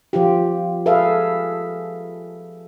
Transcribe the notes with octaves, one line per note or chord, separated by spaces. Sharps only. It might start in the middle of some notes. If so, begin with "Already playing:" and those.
F3 F4 G4
G#4 A4 B4 E5 F5